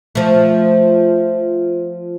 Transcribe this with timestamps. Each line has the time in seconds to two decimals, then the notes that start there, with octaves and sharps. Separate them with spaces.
0.15 F3 A3